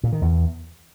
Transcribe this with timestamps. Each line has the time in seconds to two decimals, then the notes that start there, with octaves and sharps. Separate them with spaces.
0.03 A#2
0.13 D#3
0.22 E2